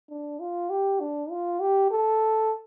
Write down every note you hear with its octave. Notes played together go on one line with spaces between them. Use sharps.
D4
F4
G4
D4
F4
G4
A4